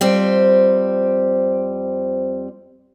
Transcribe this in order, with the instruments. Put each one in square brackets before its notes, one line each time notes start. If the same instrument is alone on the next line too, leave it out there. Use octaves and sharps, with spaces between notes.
[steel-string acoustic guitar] F2 G3 C4